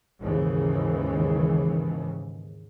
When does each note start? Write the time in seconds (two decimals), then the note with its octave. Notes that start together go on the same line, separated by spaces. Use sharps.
0.21 D#2 G#2 C#3 E3